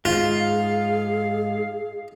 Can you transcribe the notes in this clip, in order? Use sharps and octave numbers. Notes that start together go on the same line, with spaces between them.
G#2 F4 G#4 F5